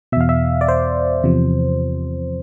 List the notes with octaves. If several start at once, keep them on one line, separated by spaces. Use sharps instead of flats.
E2 B2 E5 F5
E5
D5
C5
E2 C3 F3